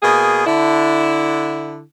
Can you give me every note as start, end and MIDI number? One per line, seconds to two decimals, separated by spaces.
0.03 0.46 47
0.03 0.46 58
0.03 0.46 68
0.46 1.82 50
0.46 1.82 64